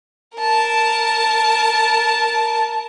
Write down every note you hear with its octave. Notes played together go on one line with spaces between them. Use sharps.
A#4 A5